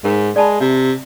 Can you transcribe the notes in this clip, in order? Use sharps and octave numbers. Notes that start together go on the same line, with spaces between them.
G#2 A#4
G#3 D5 A5 B5
C3 E5